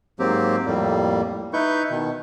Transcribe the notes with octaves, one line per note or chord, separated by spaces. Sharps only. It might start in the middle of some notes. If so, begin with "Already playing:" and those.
G#2 F#3 A#3 C4 G4
F2 A2 G3 A#3
D#4 E4 B4 C#6 G6
B2 D#3